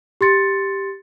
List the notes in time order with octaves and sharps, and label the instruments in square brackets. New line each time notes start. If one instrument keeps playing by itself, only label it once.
[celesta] G4 C6 A6 C#7